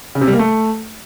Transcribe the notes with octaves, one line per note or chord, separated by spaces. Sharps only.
C#3
C3
G3
A#3
A3